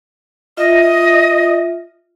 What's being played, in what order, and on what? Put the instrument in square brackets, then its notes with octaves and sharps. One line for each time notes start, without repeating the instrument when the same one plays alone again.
[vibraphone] F4 E5 [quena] D#5